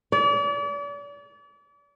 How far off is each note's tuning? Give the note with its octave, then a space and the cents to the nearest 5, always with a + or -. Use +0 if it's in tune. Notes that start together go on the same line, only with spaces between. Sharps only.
D5 -40